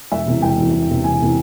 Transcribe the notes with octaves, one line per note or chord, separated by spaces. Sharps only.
E1 E5
E2 C3 E3
E1 G5
E2 C3 E3
E1
E2 C3 E3
E1 G#5
C3 E3